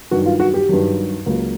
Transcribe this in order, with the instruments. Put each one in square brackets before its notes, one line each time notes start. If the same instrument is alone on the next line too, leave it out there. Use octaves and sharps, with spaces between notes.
[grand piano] G2 D#3 F#3 F#4
F4
F#4
G4
G2 D#3 F#3
C#2 C#3 F#3 A#3